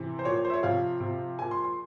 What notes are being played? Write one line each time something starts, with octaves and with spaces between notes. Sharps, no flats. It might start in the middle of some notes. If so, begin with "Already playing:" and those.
Already playing: C3 E3
C5
A#2 F3 C#5
C5
E5
C#5
C3 F3 F5
C3 F3
A#2 F3 G#5
C6
C6